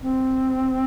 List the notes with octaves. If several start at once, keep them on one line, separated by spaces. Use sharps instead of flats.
C4